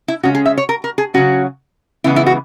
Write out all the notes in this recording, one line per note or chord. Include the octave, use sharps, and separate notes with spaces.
E4
C#3 G#3 C#4 F#4
G#4
E5
C#5
A#4
A#4
G#4
C#3 F#3 C#4 F#4
C#3 E3 G#3 B3 E4
E4
F#4